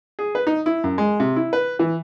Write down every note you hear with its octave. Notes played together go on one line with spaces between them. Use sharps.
G#4
B4
D#4
E4
F#2
G#3
C3
E4
B4
E3